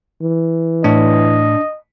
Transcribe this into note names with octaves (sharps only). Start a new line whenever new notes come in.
E3
A2 D4 D#5